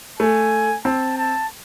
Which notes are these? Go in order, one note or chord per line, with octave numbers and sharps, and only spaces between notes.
A3 G#5
C4 A5
A5